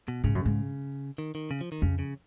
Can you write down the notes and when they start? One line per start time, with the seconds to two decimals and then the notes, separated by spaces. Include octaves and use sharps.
0.08 B2
0.24 G#2 C#3
0.35 F#2
0.45 G#2
1.18 D#3
1.35 D#3
1.51 C#3
1.61 F3
1.72 D#3
1.82 F2 C#3
1.99 C#3